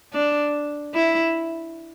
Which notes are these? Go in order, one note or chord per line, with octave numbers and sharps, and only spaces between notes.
D4
E4